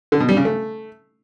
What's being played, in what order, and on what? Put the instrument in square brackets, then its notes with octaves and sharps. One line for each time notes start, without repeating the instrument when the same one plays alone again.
[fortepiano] D3
B2
G3
C#3
A3